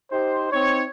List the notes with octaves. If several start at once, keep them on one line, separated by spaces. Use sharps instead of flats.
D#4 G4 C5
C4 D#4 C#5